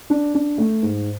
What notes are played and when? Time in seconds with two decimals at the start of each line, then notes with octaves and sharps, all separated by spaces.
0.10 D4
0.34 D4
0.58 A3
0.83 G#2